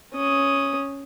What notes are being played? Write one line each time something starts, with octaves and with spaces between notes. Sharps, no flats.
C#4 D#6